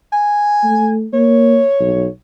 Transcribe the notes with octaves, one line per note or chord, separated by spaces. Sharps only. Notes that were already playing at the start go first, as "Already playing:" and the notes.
G#5
A3
A#3 C#5
B1